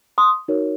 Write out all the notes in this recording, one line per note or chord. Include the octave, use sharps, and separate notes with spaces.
C6 D#6
D#4 F#4 A#4 C#5